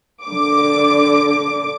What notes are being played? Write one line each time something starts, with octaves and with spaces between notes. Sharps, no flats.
D3 D6